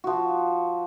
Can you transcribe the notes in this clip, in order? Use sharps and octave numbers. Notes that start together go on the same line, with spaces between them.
F3 F#4